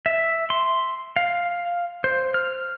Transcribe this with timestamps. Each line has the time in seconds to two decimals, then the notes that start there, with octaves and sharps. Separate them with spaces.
0.06 E5
0.50 C6
1.16 F5
2.04 C5
2.34 F6